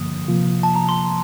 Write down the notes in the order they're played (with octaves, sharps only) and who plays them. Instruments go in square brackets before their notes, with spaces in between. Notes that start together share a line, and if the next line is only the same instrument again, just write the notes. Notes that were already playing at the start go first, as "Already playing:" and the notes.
Already playing: [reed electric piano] G2 D3 F3 A#3 [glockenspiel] D#6
[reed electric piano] C3 F3 A#3 F4
[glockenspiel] A5
A#5
C6